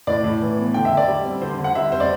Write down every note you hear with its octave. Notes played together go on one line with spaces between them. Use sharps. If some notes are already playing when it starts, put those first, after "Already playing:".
A2 D5
A2
E3
B3
D3 G5
E5
D3
D5
G3
C4
D3 C5
D3
F#5
G3 E5
C4 C5
D5